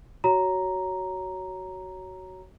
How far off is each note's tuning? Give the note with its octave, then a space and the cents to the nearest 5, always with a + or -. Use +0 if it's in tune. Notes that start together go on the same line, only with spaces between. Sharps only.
F#4 +15 C#5 +5 A#5 +0